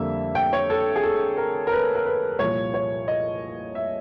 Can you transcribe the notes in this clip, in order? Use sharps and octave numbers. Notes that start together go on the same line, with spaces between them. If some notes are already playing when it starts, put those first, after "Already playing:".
Already playing: F2 D3 G3 A#3 E5
G5
C#5
A4
G#4
A4
A#4
A#4
B4
A#4
B4
C2 A#2 F3 C#5
C#5
D#5
E5